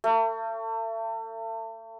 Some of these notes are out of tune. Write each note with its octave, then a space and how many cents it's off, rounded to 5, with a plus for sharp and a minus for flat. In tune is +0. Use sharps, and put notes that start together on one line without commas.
A3 +35